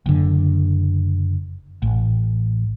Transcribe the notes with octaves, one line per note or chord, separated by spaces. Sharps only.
F#1 D3
A1